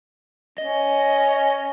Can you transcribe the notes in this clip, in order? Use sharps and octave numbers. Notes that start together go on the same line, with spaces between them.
C#4 D#5